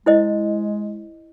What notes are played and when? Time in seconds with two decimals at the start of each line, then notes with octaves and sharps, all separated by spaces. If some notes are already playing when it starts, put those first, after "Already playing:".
0.06 G#3 E4 C5 D#5